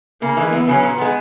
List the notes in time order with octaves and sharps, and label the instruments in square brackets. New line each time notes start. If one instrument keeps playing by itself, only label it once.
[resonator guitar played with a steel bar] C#3 [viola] A#3
[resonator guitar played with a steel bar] E3 G#3
[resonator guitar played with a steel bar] E2 [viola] B3
[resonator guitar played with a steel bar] C#3 F#3 C#4
A#2
G#3 B3